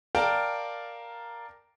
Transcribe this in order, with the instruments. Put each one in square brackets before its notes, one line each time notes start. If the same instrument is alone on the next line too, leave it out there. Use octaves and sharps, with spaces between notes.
[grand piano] A#4 D5 F5 G5 A5 A#5